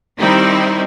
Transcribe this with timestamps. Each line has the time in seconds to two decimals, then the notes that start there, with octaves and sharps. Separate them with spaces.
0.19 D#3 G3 C4 D#4 E4